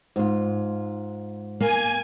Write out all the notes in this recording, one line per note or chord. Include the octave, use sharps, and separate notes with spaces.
G#2 F4
A#3 G#5